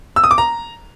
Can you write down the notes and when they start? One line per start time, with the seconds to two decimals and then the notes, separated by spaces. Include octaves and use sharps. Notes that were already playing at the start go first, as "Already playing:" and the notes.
0.16 E6
0.24 D#6
0.31 D6
0.38 A#5